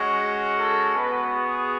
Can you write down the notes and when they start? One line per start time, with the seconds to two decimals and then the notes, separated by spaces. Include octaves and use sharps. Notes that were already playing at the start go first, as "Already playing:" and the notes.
Already playing: G#3 C#4 F#4
0.58 A4
0.96 B3 F#4 B4
1.34 G#4